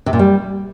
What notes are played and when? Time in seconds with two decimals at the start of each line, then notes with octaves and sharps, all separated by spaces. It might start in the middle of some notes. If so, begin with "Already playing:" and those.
0.06 C3
0.13 A#2
0.19 G3